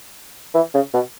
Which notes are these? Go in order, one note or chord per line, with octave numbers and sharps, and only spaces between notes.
E3
C#3
B2